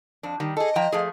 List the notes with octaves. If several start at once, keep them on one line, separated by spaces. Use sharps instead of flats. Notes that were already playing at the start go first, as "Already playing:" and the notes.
F2 D4
D#3 G3
G#4 A4 D#5
F3 G5 A#5
F3 A3 G#4